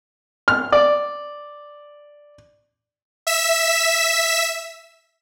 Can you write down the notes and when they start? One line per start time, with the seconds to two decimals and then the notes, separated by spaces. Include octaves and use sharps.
0.48 F6
0.72 D5
3.27 E5 B6 E7